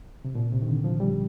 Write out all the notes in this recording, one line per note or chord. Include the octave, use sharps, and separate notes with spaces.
C3
A#2
C3
D#3
D3
F3
G3